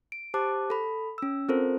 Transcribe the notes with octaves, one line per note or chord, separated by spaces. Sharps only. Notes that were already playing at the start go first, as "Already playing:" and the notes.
D7
G4 C5 A5 D6 F#6
A4 B5
C#4 E6
C4 F4 A4 A#4 C5